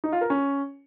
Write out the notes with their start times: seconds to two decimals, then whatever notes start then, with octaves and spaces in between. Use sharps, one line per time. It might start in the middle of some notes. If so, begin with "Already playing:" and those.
0.04 D#4
0.12 F4
0.21 A#4
0.30 C#4